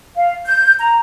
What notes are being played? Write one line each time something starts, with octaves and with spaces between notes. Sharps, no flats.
F5
G6
A#5